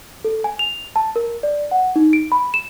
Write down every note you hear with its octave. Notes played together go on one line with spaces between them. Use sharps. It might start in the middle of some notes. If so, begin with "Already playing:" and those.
A4
G#5
F7
A5
A#4
D5
F#5
D#4
D7
B5
E7